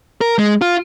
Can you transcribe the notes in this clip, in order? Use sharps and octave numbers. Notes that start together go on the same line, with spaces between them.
A#4
G#3
F4